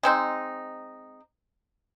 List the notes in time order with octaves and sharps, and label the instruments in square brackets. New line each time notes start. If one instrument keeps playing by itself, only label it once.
[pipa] G#3 C4 D#4